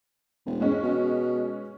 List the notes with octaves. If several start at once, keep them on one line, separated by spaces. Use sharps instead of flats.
E1
G#3 C#4
B2